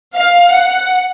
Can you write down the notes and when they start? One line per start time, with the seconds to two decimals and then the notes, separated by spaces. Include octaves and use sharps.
0.16 F5
0.51 F#5